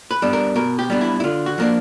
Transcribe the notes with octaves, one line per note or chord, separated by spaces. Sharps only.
B4
G3 B3 D4
A#4
B2 A#4
G4
G3 B3 D4
E4
E4
D3 F4
F#4
F3 A#3 D4